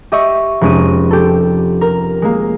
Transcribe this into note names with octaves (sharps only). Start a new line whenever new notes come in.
G4 D#5 E5 C#6
F1 G#3 C#4 D7 D#7
G4 A4
A#4
G#3 A#3